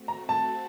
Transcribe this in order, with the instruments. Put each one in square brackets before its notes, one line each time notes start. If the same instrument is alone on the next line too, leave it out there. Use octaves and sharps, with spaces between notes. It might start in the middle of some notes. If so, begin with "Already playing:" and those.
Already playing: [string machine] A3 C4 F#4
[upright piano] A#5
A5